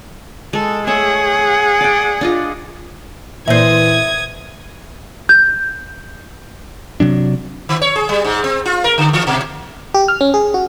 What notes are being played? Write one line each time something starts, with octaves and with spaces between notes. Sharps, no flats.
G#3 A4
A3 G#4 C#5 E5 F#5
D5 G5
D4 F4 D#5
A#2 E3 C5 E5 D#6 G#6
G6
C3 F#3 D4
D#3
C#5
G#4
G3
G#2
C4
F4
A#4
D3
E3
B2
G4
F6
C#4
G#4
F#4